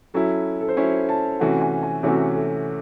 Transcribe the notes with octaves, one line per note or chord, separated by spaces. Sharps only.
F#3 C#4 E4 A4
A4
C5
F#3 C#4 E4 C#5
A5
C3 E3 A3 C#4 F#4 F#5
G#5
G#5
C3 E3 A3 C#4 F#4 C#5
A4